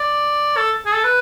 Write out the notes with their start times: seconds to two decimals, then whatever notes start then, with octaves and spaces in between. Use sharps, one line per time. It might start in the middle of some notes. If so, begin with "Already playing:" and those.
Already playing: D5
0.57 A4
0.85 G#4
0.94 A4
1.04 B4